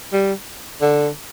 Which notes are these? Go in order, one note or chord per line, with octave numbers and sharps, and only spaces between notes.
G3
D3